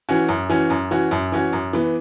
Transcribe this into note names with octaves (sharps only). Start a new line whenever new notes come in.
E3 C#4 F#4
F#2
E3 C#4 F#4
F#2
E3 C#4 F#4
F#2
E3 C#4 F#4
F#2
E3 B3